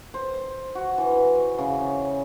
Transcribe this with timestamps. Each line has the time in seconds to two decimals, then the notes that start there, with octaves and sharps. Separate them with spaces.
0.14 C5
0.75 F#4
0.98 E3
1.59 C#3